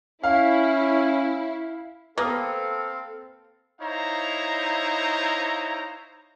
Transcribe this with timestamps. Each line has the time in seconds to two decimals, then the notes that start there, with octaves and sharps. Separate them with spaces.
0.24 C#4 E4 F5
2.18 A#3 C4 A4 B4 F5 D#6
3.80 D#4 E4 C5 C#5 F5 A#5